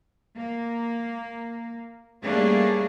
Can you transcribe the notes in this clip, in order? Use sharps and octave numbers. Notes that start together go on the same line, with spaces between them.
A#3
G3 A3 A#3 C#4 D4 G#4